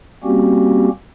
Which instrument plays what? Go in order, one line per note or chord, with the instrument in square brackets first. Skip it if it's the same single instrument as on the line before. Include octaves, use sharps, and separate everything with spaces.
[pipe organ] G3 A#3 C4 C#4 F#4 G4